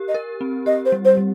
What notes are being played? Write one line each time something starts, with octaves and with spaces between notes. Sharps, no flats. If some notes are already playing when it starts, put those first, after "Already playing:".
Already playing: G4 A#4
D#5
A#4
C4
G4 D#5
C5
G3
C5
G3